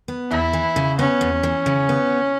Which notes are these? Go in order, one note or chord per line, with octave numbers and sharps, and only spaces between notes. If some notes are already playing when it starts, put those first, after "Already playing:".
B3
E2 E4
E3
C#3
B3 C#4
E2
E3
C#3
B3